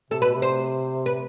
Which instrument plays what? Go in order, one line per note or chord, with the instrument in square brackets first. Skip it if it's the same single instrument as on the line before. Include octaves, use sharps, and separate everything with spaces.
[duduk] C3 [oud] A4
[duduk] B2 [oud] B4
[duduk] C3
[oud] C5
B4